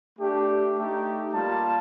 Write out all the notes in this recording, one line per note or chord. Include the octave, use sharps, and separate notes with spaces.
A3 D4 G4
A3 D#4 G4
G3 A#3 F4 A5